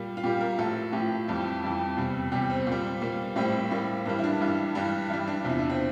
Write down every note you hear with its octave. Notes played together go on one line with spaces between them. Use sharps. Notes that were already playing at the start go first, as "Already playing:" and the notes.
Already playing: A#2 G3
F4
A#2 G3 G4
A#4
A2 F3 A4
A2 F3 G4
F2 E3 G3
F2 E3 G3
E2 C3 G3
E2 C3 G3 G4
C4
A#2 G3
A#2 G3 A#3
A2 G3 C4
A2 G3 A#3
G2 E3 G3 A#3
E4
D4
G2 E3 G3
G2 E3 G3
G2 E3 G3 E4
D4
E2 C3 F3 E4
D4
C4